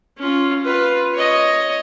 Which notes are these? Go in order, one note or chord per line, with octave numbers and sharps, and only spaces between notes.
C#4 F4
F4 B4
C#5 D#5